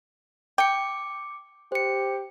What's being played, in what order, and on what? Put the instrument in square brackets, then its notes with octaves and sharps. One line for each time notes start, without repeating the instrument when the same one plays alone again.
[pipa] G5 [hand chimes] D6 C#7
[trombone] G4 [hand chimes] C5 C#7